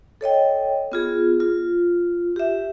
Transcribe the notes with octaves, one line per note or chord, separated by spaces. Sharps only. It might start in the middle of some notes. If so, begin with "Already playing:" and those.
A4 C#5 D#5 G5
B3 F4 G#4
F4
G4 E5